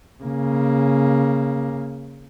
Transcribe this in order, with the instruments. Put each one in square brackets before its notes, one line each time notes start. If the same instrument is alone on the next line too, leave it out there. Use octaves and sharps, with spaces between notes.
[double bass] C#3 A#3